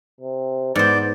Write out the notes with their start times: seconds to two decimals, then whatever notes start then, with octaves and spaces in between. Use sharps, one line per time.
0.21 C3
0.75 G#2 B3 C5 D5